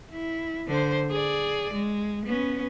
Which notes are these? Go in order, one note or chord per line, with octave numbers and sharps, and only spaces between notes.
E4
D3 C5
G#4 D5
G#3
B3 C#4